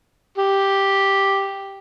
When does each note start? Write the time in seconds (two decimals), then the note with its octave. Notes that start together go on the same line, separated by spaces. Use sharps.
0.38 G4